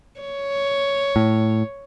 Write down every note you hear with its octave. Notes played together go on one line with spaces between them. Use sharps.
C#5
A2